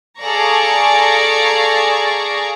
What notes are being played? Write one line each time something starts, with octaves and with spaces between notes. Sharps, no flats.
G#4 A4 D5 F5 A#5 C#6